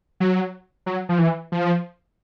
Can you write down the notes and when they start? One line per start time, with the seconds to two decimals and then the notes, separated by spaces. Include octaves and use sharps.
0.20 F#3
0.86 F#3
1.09 F3
1.19 E3
1.52 F3